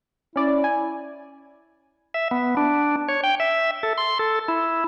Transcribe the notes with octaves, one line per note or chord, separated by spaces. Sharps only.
C#4 E4 D5
G#5
E5
B3
D4
C#5
G5
E5
A4
C6
A4
E4